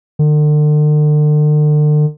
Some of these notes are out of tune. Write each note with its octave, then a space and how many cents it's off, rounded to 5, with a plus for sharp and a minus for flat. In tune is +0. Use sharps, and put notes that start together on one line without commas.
D3 +40